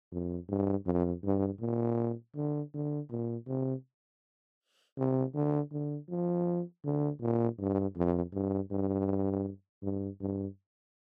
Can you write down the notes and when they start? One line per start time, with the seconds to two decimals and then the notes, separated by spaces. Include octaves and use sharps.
0.12 F2
0.49 G2
0.86 F2
1.24 G2
1.61 A#2
2.36 D3
2.74 D3
3.10 A#2
3.48 C3
4.98 C3
5.35 D3
5.72 D3
6.10 F3
6.84 D3
7.21 A#2
7.59 G2
7.96 F2
8.34 G2
8.71 G2
9.83 G2
10.21 G2